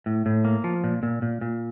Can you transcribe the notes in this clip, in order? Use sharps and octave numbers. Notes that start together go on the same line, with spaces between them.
A2
A2
A#3
F3
A#2
A#2
A#2
A#2